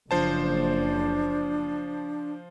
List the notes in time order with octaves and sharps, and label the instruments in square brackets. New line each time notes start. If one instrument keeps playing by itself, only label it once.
[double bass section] F#1 [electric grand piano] F3 C5 A5 [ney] D4